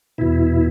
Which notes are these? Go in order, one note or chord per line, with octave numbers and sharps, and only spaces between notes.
E2 B2 E4